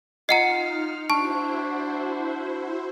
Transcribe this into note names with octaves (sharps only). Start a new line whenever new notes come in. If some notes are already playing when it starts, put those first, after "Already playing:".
D#4 F4 D#5 F#5 A#5 F6 C7 C#7
D4 E4 F#4 C5 A5 C#6